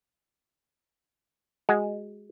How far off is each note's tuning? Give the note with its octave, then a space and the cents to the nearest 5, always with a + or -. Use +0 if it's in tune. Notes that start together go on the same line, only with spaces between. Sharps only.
G#3 +0 F#4 +15